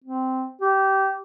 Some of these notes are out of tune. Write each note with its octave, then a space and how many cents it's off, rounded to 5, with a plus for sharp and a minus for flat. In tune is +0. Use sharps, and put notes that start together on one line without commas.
C4 -10
G4 -20